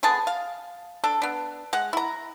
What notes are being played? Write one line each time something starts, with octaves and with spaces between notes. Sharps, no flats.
D3 B3 G#4 A5
F5
D4 A4
B3 D4
G#3 F#5
E4 A#5